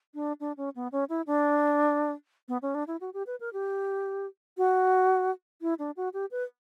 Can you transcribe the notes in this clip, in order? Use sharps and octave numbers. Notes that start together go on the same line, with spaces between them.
D4
D4
C#4
B3
C#4
E4
D4
B3
C#4
D4
E4
F#4
G4
B4
A#4
G4
F#4
E4
D4
F#4
G4
B4